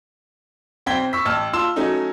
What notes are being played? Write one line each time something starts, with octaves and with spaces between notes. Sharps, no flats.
B1 C4 G5 G#6 B6 G7
C#6 E6 B6
A1 A5 E6 F6
F4 A5 C6 E6 E7
F#3 A3 C#4 D#4